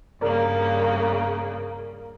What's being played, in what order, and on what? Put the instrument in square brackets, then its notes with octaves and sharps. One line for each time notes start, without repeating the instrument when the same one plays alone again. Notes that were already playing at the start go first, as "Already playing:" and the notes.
[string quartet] G2 C#3 A#3 [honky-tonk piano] A#4 D5